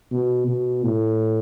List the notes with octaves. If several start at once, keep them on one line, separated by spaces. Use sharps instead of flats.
B2
B2
A2